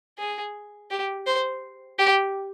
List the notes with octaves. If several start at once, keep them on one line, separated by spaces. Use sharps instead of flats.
G#4
G4
C5
G4